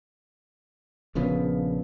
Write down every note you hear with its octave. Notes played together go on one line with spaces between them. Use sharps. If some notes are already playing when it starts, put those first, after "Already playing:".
A#1 C#3 F3 B3